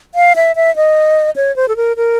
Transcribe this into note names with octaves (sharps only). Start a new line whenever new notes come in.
F5
E5
E5
D#5
C#5
C5
A4
A#4
A#4